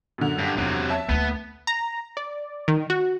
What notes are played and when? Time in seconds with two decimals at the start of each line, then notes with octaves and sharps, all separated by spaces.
0.18 F#2 D3
0.39 G2
0.58 E2 C3 F#3
0.90 E5 A5
1.09 D2 A#3 B3
1.67 A#5
2.17 D5
2.68 D#3
2.90 F#4